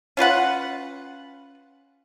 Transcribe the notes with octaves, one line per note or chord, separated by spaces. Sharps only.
C#4 F4 B4 F#5